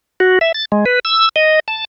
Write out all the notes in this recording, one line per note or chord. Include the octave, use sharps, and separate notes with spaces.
F#4
E5
A6
G#3
B4
E6
D#5
A5